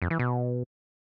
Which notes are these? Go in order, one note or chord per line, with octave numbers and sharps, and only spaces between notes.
F2
E3
B2